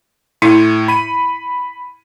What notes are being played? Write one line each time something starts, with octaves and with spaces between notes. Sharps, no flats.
A2 E4 C#7 D#7
B5 D#7